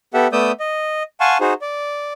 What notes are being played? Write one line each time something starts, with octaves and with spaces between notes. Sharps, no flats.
B3 G4 A4 E5 F#5
A3 B3 D5 D#6 E6 G6
D#5
F5 F#5 G#5 A5 C6 C#6
D#4 F#4 G#4 C5
D5